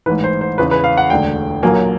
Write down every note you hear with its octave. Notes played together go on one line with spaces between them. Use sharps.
A1 G#2 E3 B4
C5
C5
E2 C#3 E3 B4
B4
F5
F#5
E1 D2 D3 G5
B1 A#2 F#3 A#3 G#5